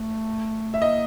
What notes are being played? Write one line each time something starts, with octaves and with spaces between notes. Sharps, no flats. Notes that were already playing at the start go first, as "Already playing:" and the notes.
Already playing: A3
E5
A#3 D#5